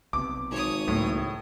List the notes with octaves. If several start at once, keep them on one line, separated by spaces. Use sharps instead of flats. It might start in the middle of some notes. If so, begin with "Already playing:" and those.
B1 C3 B3 D6
G#1 C#5 D#6
C#2 A2 F#3 A#3